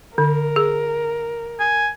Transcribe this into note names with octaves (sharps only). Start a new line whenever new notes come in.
D3 A#4
G#4
G#5